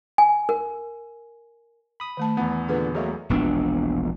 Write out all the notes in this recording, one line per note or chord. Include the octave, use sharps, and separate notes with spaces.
G#5
A#4
B5 D#6
D#3 A3 A5
E2 E3 B3 F#5
A#2 D3 G#4 B4
F#3 A3 A#3 G#4 D#5
E1 A#1 B3 D4